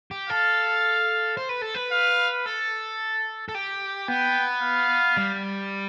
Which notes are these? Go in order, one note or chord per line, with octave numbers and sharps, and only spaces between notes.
G4
A4 F5
C5
B4
A4
B4
F5
A4
A4
G4
B3 G5
F5
G3